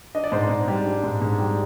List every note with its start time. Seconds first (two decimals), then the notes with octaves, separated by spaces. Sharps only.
0.15 D4 D#5
0.24 D5
0.32 G#2 C5
0.42 D5
0.50 G#2
0.68 G3
0.86 D4
1.04 G#2
1.22 G#2
1.39 G3